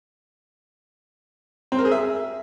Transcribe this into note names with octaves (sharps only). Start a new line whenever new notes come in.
C4
A#4
G#4
E5